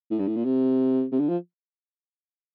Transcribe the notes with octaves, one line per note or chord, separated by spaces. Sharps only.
A2
G2
A2
A#2
C3
C3
D3
F3